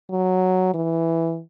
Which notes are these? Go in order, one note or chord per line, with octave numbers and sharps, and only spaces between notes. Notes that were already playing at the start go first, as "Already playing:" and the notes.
F#3
E3